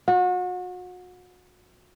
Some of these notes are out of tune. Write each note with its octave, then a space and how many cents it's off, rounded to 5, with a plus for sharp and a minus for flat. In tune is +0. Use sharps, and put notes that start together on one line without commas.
F#4 -35